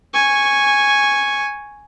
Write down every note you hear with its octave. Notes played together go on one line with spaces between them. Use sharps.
G#5 C#6